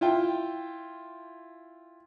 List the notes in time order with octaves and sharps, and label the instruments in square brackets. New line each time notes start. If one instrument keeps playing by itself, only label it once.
[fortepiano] E4 F4 G5